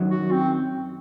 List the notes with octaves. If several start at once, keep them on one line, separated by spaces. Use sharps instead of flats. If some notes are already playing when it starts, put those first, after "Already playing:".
Already playing: F#2 D#3 F#3
F#4
C4